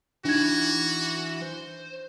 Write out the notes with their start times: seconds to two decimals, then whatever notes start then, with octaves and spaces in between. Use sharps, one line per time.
0.25 E3 D4 D#4 F#4 G#6
1.42 C5